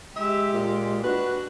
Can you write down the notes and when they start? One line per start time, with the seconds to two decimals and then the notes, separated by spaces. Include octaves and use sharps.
0.16 G#3 G4 E5
0.53 A#2
1.04 D4 F#4 B4